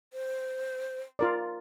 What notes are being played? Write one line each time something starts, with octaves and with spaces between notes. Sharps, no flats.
C5
F4 A#4 D5